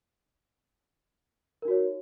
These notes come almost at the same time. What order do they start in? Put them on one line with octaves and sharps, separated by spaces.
A#4 D#4 F#4 C#5